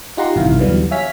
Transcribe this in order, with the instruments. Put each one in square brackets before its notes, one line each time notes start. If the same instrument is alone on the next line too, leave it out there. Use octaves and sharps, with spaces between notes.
[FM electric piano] D#4 F4 G4 F#5 A#5 C6
A1 G2 C3 D#3 E4 F5
D#2 D3 E3 F#3 G3 B3
C#5 E5 F5 G#5 F6 B6